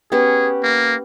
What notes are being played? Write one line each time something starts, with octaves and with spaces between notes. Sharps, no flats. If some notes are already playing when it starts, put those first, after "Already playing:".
B3 C#4 G4 G#4
A#3